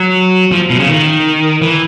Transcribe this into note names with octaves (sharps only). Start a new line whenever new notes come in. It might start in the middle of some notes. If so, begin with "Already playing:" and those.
Already playing: F#3
F3
B2
C#3
D#3
E3